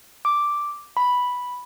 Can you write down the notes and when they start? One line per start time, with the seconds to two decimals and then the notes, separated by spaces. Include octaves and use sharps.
0.25 D6
0.97 B5